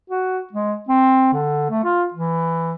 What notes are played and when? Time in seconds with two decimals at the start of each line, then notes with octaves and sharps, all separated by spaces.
0.10 F#4
0.53 G#3
0.89 C4
1.33 D3
1.70 A3
1.84 F4
2.14 E3